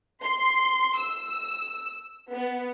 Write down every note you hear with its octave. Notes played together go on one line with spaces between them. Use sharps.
C6
E6
B3